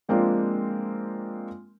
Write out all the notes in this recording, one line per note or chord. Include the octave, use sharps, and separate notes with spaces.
F3 G#3 A#3 C4 D4 F4